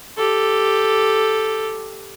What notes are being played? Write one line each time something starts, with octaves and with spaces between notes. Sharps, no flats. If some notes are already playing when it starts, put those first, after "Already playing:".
G4 A4